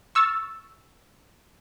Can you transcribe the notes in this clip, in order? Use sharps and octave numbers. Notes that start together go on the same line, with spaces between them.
C#6 E6 F6 A6